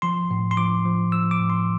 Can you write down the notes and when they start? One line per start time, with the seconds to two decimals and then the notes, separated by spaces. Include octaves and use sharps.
0.02 F3 C6
0.31 A2
0.51 C6
0.57 F3 D6
0.85 F3
1.12 F3 E6
1.31 D6
1.40 A2
1.50 C6